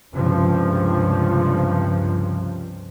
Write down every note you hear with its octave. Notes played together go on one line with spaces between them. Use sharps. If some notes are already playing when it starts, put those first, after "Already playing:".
C#2 G2 C3 F3